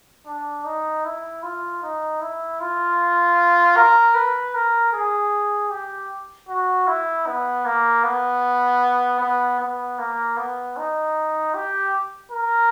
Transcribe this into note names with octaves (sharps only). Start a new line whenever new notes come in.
D4
D#4
E4
F4
D#4
E4
F4
A#4
B4
A#4
G#4
G4
F#4
E4
B3
A#3
B3
B3
B3
A#3
B3
D#4
G4
A#4